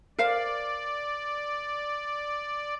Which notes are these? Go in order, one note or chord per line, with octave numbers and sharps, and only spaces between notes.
A#4 C5 D5 F5